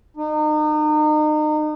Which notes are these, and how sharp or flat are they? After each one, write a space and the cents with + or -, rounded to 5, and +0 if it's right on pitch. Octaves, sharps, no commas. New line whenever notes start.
D#4 -35